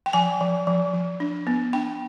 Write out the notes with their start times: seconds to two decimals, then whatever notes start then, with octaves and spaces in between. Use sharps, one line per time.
0.06 G5
0.13 F3 G#5
0.41 F3
0.67 F3
0.94 F3
1.20 D4
1.47 B3
1.73 D4 G5